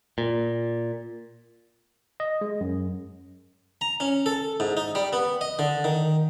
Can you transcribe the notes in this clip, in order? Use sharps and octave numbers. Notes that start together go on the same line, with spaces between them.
A#2
D#5
G#3
F#2
A#5
C#4
A4
G#2
D#4
G3
B3
D#5
D3
D#3